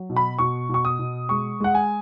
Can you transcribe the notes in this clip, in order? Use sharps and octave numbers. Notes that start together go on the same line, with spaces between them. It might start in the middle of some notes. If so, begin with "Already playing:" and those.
Already playing: F#3
B2
B5
B2 C#6
B2 C#6
D#6
B2
G#3 C#6
G#3 F#5
G#5